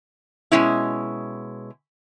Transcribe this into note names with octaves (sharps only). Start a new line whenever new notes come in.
B2 D3 G#3 C#4 E4